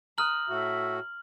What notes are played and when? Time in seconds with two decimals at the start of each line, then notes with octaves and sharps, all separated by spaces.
0.18 A#5 D#6 F6 F#6 F#7
0.49 A2 F#4 E5